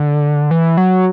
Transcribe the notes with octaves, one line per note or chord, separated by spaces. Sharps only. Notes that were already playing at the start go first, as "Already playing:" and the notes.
Already playing: D3
E3
F#3